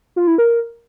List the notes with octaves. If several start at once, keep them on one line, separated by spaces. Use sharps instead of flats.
F4
E4
A#4